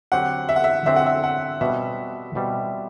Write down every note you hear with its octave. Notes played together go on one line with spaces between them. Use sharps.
D3 F#3 C4 G4 C5 F#5
E5
F#5
E5
D3 F#3 C4 G4 C5 E5
F#5
E5
F#5
B2 G3 C4 E5
B2 G3 C4